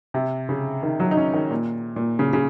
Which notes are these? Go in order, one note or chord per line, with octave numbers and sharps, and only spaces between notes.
C3
C#3
D#3
F#3
D#4
C#4
D#3
A#2
A#2
C#3
C#3